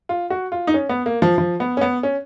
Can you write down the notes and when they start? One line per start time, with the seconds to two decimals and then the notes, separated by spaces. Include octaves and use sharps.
0.09 F4
0.30 F#4
0.52 F4
0.67 D#4
0.74 C#4
0.89 B3
1.06 A#3
1.22 F3
1.38 F3
1.60 B3
1.77 C#4
1.81 B3
2.03 C#4